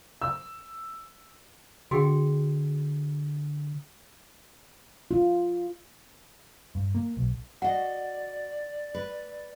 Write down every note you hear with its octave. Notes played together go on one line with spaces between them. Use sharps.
E6
D3 F#4 G#4 G5
F4
G2
A#3
B1
F#4 D5 D#5 F#5
B4